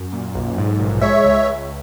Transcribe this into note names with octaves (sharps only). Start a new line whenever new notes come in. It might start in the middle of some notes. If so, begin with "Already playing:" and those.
Already playing: F#2
A#2
B1
G#2
A#1
G#3 C#5 E5
C#2
C#2